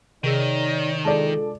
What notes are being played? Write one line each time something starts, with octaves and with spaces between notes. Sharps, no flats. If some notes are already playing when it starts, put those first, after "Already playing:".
C3 D#3 D#4 G#4 C#5 D5 E6
G#3 D4 F4 A4 D5 A5